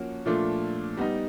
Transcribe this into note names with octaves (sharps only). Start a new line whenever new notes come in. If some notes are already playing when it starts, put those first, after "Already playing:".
Already playing: F3 A#3 C#4 F#4
A#2 F3 A3 D4 F4
G3 B3 D#4